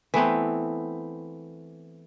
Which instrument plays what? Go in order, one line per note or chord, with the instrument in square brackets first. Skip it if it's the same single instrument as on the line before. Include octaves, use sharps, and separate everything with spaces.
[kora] E3 A3 B3 C4